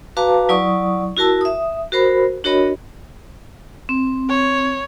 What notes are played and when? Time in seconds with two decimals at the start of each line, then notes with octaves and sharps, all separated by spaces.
0.17 F#4 B4 F5 A5 A#5 D6
0.49 F#3 E4 D5 C#6 D#6
1.17 E4 F#4 A#4 A5 E6
1.41 E5 D#6
1.92 F#4 A#4 C5 B5
2.44 D4 F#4 A#4 C#5 D#5 B5
3.89 C4
4.29 C#5